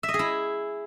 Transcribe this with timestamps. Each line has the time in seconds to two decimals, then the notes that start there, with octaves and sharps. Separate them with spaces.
0.03 E5
0.09 D#5
0.14 G#4
0.19 E4